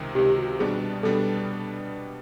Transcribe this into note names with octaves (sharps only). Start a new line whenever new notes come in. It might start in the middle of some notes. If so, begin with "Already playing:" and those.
Already playing: C#2 C3 D#3
C#2 C3 D#3 G4
F#4
B2 G3 B3 D4 G#4
B2 G3 B3 D4 A4